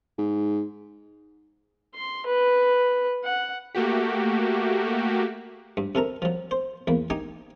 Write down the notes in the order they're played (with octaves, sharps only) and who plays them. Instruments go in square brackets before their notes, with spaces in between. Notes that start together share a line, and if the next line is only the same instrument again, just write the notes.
[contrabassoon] G#2
[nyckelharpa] C6
B4
F#5
[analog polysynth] A3 A#3 F#4 G4
[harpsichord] G2
C3 A4 A#4 A#5
F3 F#3
C5
E2 A#3 B5
D#4 G4 G#5 A#5 D#6